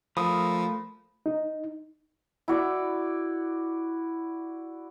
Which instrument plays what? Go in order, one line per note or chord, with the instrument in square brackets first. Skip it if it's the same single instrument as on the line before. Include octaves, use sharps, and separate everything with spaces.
[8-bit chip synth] F3 [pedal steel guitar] A3 A#4 D#6 [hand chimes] B5
[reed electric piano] D#4
[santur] E4 F#4 D5